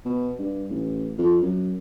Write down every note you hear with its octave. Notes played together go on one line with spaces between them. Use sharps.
B2
G2
A1
F2
F#2